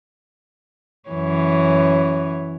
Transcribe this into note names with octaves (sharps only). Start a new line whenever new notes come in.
F#2 E3 C#5